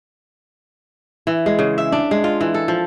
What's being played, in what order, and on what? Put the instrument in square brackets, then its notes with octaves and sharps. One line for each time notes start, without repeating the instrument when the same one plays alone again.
[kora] E3
G#3
C#3
E5
D4
G#3
F4
E3
A4
F3